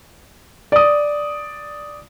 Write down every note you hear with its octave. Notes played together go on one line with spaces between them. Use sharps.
D5 D#6